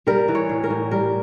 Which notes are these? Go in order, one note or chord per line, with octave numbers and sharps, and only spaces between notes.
G3 A#4
E3
C#5
A2
A#4
A2
G3 A#4